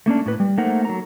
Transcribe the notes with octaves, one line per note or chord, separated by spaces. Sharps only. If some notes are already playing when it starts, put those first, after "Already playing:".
A3 A#3 C#4 D4
A2 B4
G3
A3 A#3 D#4 A#4 C5 F#5
F#3 A4 A#5